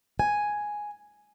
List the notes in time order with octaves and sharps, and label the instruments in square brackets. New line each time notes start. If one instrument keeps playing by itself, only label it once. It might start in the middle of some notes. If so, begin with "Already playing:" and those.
[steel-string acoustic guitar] G#5